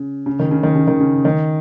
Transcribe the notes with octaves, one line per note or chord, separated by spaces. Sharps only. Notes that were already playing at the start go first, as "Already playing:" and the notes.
Already playing: C#3
C#3
D#3
C#3
D#3
C#3
D#3
C#3
D#3